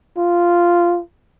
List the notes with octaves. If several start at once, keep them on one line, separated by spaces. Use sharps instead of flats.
F4